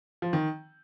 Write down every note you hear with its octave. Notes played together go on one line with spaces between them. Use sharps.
F3
D#3